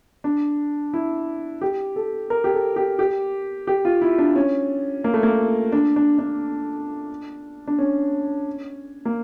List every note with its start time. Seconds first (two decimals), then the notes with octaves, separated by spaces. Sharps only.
0.24 D4
0.93 E4
1.61 G4
1.96 A4
2.30 A#4
2.44 G4
2.54 A4
2.76 G4
2.99 G4
3.67 G4
3.85 F4
4.02 E4
4.18 D4
4.36 C#4
5.04 A#3
5.14 A3
5.23 A#3
5.72 D4
5.96 D4
6.19 D4
7.67 D4
7.79 C#4
9.05 A#3